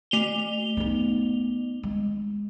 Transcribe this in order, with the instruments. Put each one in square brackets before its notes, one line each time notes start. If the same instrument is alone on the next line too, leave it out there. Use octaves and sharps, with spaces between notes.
[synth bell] A3 F7 G7
[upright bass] B3 D#4
G#3